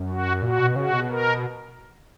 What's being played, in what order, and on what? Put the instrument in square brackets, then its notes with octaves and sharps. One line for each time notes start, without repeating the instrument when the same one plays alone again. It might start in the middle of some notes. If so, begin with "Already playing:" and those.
Already playing: [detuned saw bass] F#2
[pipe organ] F#4
[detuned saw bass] A#2 [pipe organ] F#4
[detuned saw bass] B2
[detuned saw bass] C#3 [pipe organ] F#4
[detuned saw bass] B2
[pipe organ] A#4